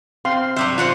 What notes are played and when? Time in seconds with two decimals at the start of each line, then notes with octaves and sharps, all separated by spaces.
0.25 C4 F5 C6
0.56 C3 F#3 G3 C5 E5
0.78 F#3 F4 F#4 C5 F#5